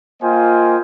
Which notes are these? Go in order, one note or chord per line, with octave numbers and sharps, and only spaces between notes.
A#3 F4 C5 D#5 G5 G#5